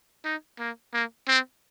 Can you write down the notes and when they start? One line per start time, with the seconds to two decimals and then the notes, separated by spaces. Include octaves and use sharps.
0.25 D#4
0.59 A#3
0.93 A#3
1.28 C4